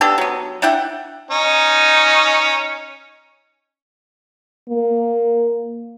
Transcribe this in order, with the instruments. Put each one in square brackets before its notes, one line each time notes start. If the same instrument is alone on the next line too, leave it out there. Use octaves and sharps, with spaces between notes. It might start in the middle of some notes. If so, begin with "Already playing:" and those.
[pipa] B3 D4 G4 A4
F#3 B3
D4 E4 F#5 G5
[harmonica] C#4 D#4
[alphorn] A#3